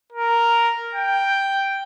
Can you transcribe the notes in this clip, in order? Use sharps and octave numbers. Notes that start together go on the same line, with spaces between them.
A#4
G5